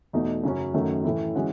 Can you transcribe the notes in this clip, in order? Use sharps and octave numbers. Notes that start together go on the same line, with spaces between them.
E2 B2 A3 D#4
F#2 C#3 F#3 C#4
F#2 D#3 F#3 A3 C#4
A2 E3 A3 E4
E3 G#3 C#4 F#4